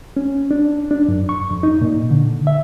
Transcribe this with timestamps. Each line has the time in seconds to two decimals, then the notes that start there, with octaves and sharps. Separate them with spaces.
0.17 C#4
0.51 D4
0.91 D4
1.08 F#2
1.29 C#6
1.51 F2
1.63 D#4
1.82 A#2
2.11 D3
2.47 E5